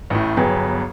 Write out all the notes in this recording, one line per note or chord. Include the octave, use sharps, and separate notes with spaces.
A1 A2
G1 F#3 B3 G#4 G5